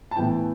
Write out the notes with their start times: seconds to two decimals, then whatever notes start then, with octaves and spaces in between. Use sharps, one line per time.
0.11 A5
0.16 A2 E3 B3 E4 G5